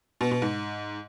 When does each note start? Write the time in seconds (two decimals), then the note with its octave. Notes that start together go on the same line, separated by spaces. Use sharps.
0.21 B2
0.31 B2
0.42 G#2